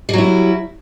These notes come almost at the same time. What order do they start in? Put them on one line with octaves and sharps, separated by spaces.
G3 F#3 E4